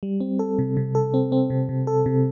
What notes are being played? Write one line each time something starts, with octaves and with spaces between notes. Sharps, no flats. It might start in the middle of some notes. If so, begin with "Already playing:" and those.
G3
C4
A4
C3
C3
A4
C4
C4
C3
C3
A4
C3